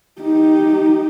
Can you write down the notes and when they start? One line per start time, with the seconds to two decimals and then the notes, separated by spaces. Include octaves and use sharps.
0.21 D#4 G4